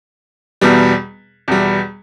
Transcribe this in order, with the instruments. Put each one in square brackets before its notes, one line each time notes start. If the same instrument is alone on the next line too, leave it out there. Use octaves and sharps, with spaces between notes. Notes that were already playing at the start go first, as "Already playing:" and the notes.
[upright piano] E2 B2 G3
E2 B2 G3